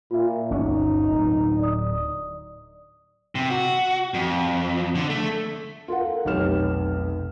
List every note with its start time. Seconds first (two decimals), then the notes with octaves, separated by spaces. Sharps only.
0.11 A#2 F4 E5
0.51 G1 D2 C#4 D#4
1.11 D1
1.59 D5 D#6
3.35 C3
3.50 F#4
4.14 F2
4.95 D3
5.10 A3
5.88 F4 A4 A#4 F#5
6.25 F1 B1 G4 C#5 F6 E7